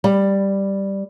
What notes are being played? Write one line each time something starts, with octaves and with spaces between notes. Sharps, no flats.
G3